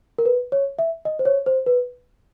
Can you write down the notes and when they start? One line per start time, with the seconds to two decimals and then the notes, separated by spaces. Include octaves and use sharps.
0.18 A#4
0.25 B4
0.52 C#5
0.79 E5
1.05 D#5
1.19 C5
1.25 C#5
1.46 C5
1.66 B4